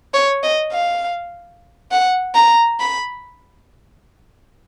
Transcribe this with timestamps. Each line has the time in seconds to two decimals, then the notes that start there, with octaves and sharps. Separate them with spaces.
0.14 C#5
0.44 D#5
0.72 F5
1.91 F#5
2.35 A#5
2.80 B5